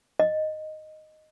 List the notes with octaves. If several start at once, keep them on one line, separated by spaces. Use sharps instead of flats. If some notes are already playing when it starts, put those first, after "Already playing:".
D#5